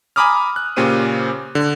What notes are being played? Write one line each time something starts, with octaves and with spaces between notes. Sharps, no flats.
G#5 A#5 B5 D6 D#6 F6
F#6
A#2 C#3 C#4 G4 C5 D#7
D3